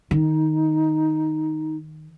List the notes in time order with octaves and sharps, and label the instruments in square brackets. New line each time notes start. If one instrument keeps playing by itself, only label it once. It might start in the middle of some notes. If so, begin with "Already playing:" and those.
[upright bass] D#3 [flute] D#4